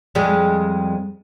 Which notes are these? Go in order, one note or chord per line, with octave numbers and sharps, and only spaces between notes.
F2 G3 G#3